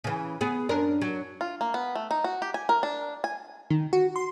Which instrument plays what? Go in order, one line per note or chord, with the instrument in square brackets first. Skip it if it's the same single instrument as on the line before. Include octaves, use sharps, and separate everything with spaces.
[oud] C#3 E3
B3 G#4
F#2 D4 A#4
F#3
[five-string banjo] F4
A#3
B3
A3
D#4
F#4
G4
G#5
A#4
D4
G#5
[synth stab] D#3
F#4
C6